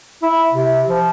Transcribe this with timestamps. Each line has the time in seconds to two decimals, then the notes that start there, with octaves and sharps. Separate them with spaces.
0.23 E4
0.52 C3
0.89 F3